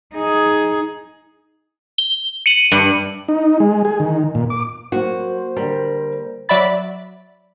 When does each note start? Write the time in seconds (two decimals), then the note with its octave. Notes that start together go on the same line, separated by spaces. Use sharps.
0.15 D#4 G#4
1.98 G7
2.46 C#7 D#7 F#7
2.72 G2
3.28 D#4
3.60 G#3
3.85 G#4
4.00 D#3
4.35 A#2
4.50 D6
4.92 F#3 A#3 F#4 C5
5.57 D3 G3 A#3 A#4
6.49 F#3 D5 E5 B5 A6